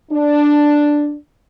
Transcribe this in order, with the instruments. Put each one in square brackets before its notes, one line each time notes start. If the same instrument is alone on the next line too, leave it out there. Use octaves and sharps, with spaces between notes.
[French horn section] D4